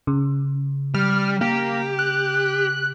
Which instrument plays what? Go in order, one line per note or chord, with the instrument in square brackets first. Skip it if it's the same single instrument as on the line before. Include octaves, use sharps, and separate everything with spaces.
[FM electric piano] C#3
[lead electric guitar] G3 [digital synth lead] F6
[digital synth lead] A#3 [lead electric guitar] G4
[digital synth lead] F#6